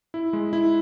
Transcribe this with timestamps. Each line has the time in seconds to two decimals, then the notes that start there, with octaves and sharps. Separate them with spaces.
0.14 E4
0.33 G#3
0.53 E4